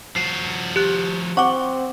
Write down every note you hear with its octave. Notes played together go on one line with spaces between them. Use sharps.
F3 F#4 C7
G4 F#6
C4 F#5 C#6 D6